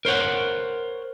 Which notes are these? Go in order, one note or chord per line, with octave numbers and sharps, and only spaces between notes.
A#4 C5 C#5 F#5